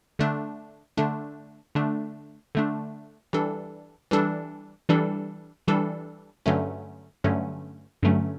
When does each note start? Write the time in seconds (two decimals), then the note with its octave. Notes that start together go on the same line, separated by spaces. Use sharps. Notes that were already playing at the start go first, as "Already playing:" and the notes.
0.19 D3 A3 D4
0.97 D3 A3 D4
1.75 D3 A3 D4
2.55 D3 A3 D4
3.33 E3 G3 D4 A4
4.11 E3 G3 D4 A4
4.89 E3 G3 D4 A4
5.68 E3 G3 D4 A4
6.46 G2 D3 F#3 A3 C#4
7.24 G2 D3 F#3 A3 C#4
8.03 G2 D3 F#3 A3 C#4